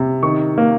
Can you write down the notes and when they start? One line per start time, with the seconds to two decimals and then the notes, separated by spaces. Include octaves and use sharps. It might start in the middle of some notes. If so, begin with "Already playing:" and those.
Already playing: C3
0.23 D#3 C#6
0.58 A#3